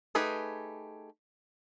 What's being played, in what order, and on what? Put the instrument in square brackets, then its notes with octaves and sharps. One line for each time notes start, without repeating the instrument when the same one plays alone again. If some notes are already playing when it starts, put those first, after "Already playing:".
[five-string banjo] A3 D#4 G4 G#4 B4